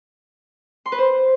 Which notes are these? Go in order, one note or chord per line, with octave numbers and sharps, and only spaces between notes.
C6
B4
C5